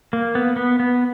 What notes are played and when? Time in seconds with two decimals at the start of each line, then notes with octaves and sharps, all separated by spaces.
0.13 A#3
0.35 B3
0.56 B3
0.80 B3